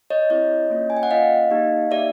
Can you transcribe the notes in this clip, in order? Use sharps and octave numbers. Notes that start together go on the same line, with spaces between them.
C#5 D#5
C4 E4 G4 C#5 D#5
A#3 C#4 F4
G#5
G5
F#5
A#3 C#4 F4 D#5 F5
A#3 D#4 G4
A#3 D#4 G4 D5 E5